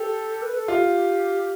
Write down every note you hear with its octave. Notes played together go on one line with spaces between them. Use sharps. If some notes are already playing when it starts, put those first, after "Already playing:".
Already playing: G4 A4
B4
A4
F4 G4